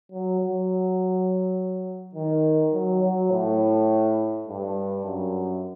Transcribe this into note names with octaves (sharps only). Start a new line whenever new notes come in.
F#3
F#3
D#3
F#3
F#3
A2
G2
F#2